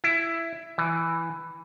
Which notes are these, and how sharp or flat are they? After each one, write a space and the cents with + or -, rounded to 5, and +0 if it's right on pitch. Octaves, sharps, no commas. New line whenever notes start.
E4 +10
E3 +5